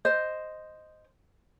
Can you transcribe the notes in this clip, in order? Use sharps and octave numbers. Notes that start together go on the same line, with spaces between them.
C5 D#5